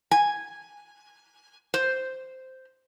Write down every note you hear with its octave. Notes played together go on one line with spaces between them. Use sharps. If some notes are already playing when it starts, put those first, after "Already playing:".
G#5
C5